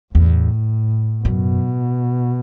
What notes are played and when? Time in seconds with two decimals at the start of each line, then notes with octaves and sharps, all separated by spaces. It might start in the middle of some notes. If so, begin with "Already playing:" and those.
0.14 E2 A2
1.24 F#2 B2